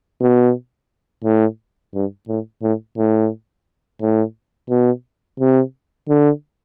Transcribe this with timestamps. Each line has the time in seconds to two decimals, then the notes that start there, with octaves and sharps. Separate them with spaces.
0.21 B2
1.24 A2
1.94 G2
2.28 A2
2.62 A2
2.98 A2
4.01 A2
4.70 B2
5.40 C3
6.09 D3